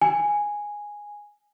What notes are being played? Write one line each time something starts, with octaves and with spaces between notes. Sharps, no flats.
G#5